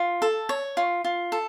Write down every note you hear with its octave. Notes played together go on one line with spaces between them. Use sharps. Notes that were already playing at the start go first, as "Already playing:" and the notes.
Already playing: F4
A4
C#5
F4
F4
A4